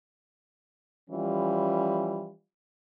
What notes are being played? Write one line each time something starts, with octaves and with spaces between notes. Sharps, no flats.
E3 F3 G3 C#4 F4